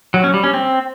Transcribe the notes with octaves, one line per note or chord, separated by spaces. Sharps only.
F#3
C#4
G3
C#4
C4